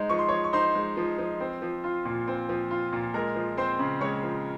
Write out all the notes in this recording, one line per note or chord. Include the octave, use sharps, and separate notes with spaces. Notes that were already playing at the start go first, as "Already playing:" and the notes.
Already playing: G#3 D#4 C5
F3 C#6
C6
C#5 C#6
F3
C#6
D#4 C5 C6
G#3
F3
F3
C4
F3
F4
A#2
C4
F3
F4
A#2
G#3 A#4 A#5
F3
C4 C5 C6
C#3
G#3 C#5 C#6
F3